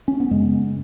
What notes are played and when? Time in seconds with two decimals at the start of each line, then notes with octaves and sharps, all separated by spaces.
0.08 C#4
0.20 B3
0.31 F#2 C#3 G#3